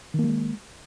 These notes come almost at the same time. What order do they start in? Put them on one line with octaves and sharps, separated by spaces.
D#3 A#3 G3 G#3